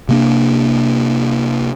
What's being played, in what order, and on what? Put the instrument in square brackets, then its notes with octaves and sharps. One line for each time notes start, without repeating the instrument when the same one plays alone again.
[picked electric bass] C3 A#3 D4